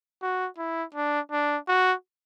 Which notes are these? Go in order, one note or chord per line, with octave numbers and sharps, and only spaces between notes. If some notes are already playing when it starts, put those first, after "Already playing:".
F#4
E4
D4
D4
F#4